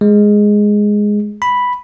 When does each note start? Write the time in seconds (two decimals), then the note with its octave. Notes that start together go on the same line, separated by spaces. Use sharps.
0.01 G#3
1.42 B5